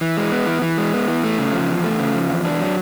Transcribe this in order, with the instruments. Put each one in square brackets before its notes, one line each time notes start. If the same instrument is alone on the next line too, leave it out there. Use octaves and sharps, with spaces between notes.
[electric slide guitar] E3
G#3
B3
E3
E3
G#3
B3
E3
A3
C#3
F3
E2
A3
C#3
F3
E2
D4
F#3